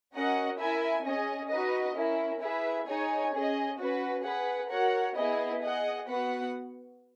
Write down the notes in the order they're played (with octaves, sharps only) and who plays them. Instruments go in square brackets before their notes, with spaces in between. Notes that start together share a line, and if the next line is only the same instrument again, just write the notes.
[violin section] C#4 F#4 A#4 D#5 F#5
E4 A#4 E5 G#5
C#4 G#4 D#5
D#4 F#4 B4 D#5
C#4 E4 A#4
E4 G#4 B4 E5
D#4 G#4 C#5 G#5
C#4 G#4 D#5
C#4 F#4 B4
G#4 B4 F#5
F#4 A#4 C#5 F#5
B3 E4 G#4 D#5
G#4 D#5 F#5
B3 F#4 B4 F#5